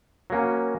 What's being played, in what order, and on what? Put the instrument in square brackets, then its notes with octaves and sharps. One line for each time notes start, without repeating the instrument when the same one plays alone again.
[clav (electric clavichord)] F#3 A#3 C#4